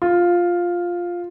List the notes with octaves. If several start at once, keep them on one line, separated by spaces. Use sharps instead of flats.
F4